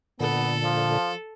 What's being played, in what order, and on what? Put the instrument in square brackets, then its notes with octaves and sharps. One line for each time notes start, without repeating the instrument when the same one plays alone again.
[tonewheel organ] A#2 D3 [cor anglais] B3 [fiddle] A4
[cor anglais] F3